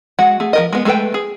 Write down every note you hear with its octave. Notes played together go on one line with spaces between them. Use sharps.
G#3 F#4 F#5
A3 G#4
F3 A#4 D#5
G#3 B3
G#3 A3 A4 B4 G5
G#4